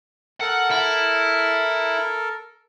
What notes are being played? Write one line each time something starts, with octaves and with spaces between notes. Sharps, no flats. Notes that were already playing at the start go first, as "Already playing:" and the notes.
A4 A#4 F#5
E4